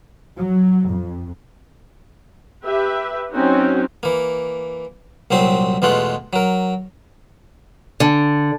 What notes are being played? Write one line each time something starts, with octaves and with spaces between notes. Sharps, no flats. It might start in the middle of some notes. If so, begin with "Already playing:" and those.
F#3
F2
G4 B4 E5
F#3 C4 C#4 D#4 F#4
E3 A#3
C2 A#2 F#3 C4 C6
E2 B2 G#3 A3 F4 F#5
F#3 A#4
D3